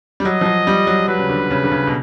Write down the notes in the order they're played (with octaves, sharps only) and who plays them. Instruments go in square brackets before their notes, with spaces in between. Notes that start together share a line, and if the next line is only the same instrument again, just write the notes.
[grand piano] G3
[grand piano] F#3 [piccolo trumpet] D#5
[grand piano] F3
F#3
G3
F#3
[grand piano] F#3 [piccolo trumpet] B4
[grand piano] C#3
D3
C#3
D3
C#3
B2